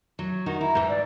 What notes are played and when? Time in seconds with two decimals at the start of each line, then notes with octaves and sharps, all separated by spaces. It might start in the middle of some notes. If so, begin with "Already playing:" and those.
0.19 F#3
0.46 D#3 D#4 F#4
0.61 E4 A#5
0.75 G#2 E3
0.89 D5